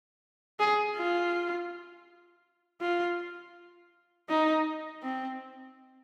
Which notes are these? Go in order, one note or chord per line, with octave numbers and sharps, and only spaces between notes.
G#4
F4
F4
D#4
C4